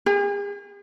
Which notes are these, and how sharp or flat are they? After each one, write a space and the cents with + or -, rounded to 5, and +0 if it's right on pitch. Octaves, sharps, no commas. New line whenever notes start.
G#4 -45